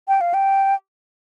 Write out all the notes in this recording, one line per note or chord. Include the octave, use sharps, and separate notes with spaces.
G5
F5
G5